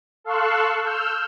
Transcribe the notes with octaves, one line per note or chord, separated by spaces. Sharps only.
A4 F5 C6 C#6 E6 F#6
E6 F6 G6